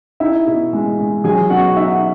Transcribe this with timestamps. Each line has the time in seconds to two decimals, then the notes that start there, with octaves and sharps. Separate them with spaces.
0.20 D#4 E4 E5
0.47 B2
0.73 G#3
0.99 G#3
1.24 F#3 G#4 G#5
1.50 B2 F#4 F#5
1.76 D#4 E5
1.88 F#5